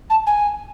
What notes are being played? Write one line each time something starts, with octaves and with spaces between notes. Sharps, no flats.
A5
G#5